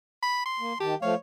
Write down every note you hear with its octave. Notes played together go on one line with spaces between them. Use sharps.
B5
C6
A#3
D#3 G4 A5
F3 A3 C#5 F5